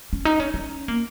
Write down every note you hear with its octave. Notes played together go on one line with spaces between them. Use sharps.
C#4
D#4
C#4
C#4
A#3